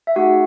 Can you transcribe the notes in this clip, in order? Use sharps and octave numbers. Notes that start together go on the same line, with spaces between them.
E5
A3 D#4 F#4 G#4 F#5